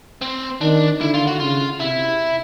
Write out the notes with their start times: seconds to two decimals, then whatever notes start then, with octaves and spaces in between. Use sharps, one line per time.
0.21 C4
0.61 D#3 D4
1.01 D3 E4
1.14 F4
1.27 F#4
1.40 C#3 F4
1.80 C3 E4